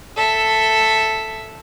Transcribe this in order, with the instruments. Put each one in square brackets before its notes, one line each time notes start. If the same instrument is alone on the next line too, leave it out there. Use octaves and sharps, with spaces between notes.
[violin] A4 E5